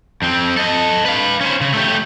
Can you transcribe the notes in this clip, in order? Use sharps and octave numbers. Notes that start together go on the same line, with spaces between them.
F2 C4
A4 D#5
B4 F5
C#4 C5
C#3
A3 G4